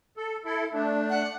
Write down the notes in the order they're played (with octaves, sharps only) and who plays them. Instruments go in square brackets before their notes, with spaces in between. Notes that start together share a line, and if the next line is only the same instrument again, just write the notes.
[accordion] A4
E4 A4
A3 D4
[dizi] F#5